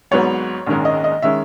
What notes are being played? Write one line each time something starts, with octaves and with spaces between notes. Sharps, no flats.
G#1 G#2 F#3 B3 C#5
A#1 G#2 D#3 G#3 C#4
D#5
D#5
D#3 G#3 C#4 E5